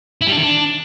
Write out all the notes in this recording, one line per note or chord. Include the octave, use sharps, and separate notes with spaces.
E4
G3
D4
D#3
D4